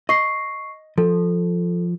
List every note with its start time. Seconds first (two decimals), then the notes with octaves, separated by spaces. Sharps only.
0.09 D#5 C#6 C7
0.98 F3 A4